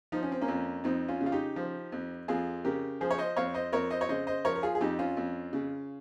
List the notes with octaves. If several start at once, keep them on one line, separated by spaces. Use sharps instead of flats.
F3 D#4
C#4
C4
A#3 C#4
F2
F2 C4 D#4
C#4 F4
C#3
F4
D#4 G4
F3
F2
F2 F4 G#4
C#3 G4 A#4
F3 G#4 C5
C#5
C5 D#5
F2 C#5 F5
C5 D#5
F2 A#4 C#5
C5 D#5
C#5
C#3 C5 D#5
C5 D#5
F3 A#4 C#5
A#4
F4 G#4
G#4
F2 D#4 G4
C#4 F4
F2
C#3